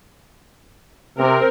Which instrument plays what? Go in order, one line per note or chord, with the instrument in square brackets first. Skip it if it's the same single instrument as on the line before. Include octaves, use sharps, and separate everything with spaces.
[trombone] C3 [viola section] C4 A#4